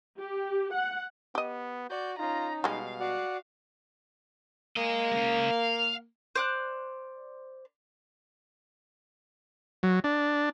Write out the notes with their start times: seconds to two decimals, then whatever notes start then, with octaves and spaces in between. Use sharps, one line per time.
0.19 G4
0.74 F#5
1.35 B3 G4 D#5
1.90 F#4 D5 G6
2.19 C#4 D#4 F4 A#5
2.64 B2 G3 G#3 F5
3.00 F#4 D5 F#5
4.77 A#3 G#4 D#5
5.11 G#3 C#4
5.50 F5
6.36 C5 D5 F#6
9.83 F#3
10.04 D4